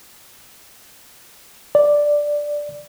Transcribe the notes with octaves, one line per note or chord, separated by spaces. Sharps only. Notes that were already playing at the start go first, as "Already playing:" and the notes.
D5